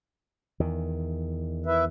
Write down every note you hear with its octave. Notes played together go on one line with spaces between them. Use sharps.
E2 D#3
E4 B4 E5